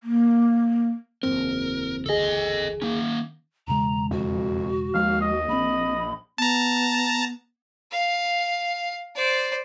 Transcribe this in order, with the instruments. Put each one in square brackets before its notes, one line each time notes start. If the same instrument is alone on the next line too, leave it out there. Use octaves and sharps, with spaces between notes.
[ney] A#3
[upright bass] F#1 E2 [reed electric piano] C4 [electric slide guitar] A#4
[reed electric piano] D2 G#4 [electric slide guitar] A4 D#5
[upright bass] D#3 [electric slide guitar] A#3 C#4
[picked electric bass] E1 C#3 G#3 [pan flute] A#5
[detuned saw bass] F2 [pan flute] F#4
[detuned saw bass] D#2 [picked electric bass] F3 G#3 [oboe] F5
[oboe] D#5
[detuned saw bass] A#1 [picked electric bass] A#3 C4 [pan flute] B5
[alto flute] B3 [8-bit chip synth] A5 A#5
[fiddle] F5
C5 D5